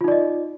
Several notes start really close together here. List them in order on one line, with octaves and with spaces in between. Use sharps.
F4 D#4 D5 D#5